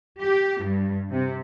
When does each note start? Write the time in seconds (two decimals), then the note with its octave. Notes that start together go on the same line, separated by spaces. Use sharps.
0.21 G4
0.63 G2
1.12 C3